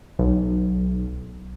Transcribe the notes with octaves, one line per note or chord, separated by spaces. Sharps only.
B1